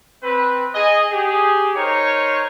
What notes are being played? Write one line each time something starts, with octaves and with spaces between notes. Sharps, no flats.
C4 B4
G#4 D#5
G4 G#4
D#4 A#4 C5 C#5